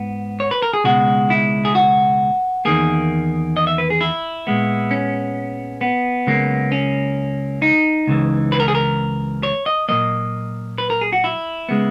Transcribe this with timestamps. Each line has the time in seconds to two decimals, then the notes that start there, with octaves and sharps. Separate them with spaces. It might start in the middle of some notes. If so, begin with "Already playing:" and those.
Already playing: G#2 B3
0.40 C#5
0.51 B4
0.62 A#4
0.74 G#4
0.84 C#2 B2 G#3 F#4
1.30 E4
1.65 G#4
1.75 F#4
2.65 E2 D#3 A#3 G#4
3.57 D#5
3.67 E5
3.78 B4
3.90 G#4
4.01 E4
4.47 A#2 G#3 B3
4.91 C#4
5.81 B3
6.27 C#2 C#3 F#3 A#3
6.72 C#4
7.62 D#4
8.07 C#2 C#3 E3
8.52 B4
8.60 A#4
8.68 G#4
8.75 A#4
9.43 C#5
9.66 D#5
9.89 A#2 F#3 A#3 D#5
10.78 B4
10.90 A#4
11.01 G#4
11.13 F#4
11.24 E4
11.69 C#3 G#3 B3